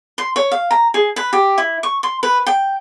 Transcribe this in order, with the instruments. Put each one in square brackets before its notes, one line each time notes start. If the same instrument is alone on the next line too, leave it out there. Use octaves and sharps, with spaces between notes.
[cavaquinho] C6
C#5
F5
A#5
G#4
B4
G4
E4
C#6
C6
B4
G5